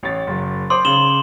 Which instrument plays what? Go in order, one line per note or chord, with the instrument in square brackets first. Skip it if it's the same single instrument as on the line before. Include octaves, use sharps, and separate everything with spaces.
[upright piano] A1 C#5 A6
F#1
[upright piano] C5 D6 D#6 [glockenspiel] C6
[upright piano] C#3 [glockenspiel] E7 F#7 G7